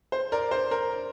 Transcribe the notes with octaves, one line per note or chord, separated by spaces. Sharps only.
C5
A#4 D5
C5
A#4